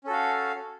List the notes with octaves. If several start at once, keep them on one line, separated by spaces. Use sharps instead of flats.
C#4 F#4 A4 F5